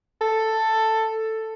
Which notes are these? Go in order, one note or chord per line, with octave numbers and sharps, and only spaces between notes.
A4